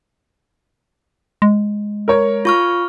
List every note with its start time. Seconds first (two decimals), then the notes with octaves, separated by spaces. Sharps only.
1.42 G#3
2.08 A#4 C#5
2.45 F4 C#6 F6